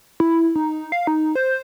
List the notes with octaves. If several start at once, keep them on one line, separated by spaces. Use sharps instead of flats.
E4
D#4
F5
D#4
C5